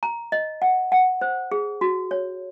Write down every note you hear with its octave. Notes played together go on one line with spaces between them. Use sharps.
A#5
D#5
F#5
F#5
C5
G#4
F#4
C#5